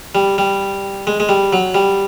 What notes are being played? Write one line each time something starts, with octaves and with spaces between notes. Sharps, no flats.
G3
G3
G#3
G#3
G3
F#3
G3